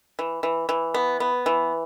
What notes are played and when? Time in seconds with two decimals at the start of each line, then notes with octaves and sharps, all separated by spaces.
0.19 E3
0.43 E3
0.69 E3
0.94 B3
1.20 B3
1.46 E3